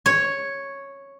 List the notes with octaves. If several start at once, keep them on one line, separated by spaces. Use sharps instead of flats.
C#5